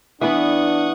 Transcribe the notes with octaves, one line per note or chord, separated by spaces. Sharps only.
E3 B3 D4 F#5 C#6 D#6